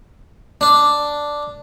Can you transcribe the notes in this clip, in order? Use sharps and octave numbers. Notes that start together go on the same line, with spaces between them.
D4